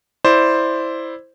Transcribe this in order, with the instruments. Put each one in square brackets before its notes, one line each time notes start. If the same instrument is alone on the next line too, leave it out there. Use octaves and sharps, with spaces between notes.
[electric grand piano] E4 C5 D5